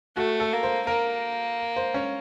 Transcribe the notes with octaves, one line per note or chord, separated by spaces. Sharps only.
A3 F#4
A4
A#3
C5
A#3 A#4
C5
C#4